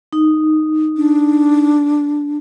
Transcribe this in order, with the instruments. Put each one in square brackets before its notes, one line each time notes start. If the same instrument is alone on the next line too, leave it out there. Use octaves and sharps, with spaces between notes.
[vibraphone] D#4
[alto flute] D4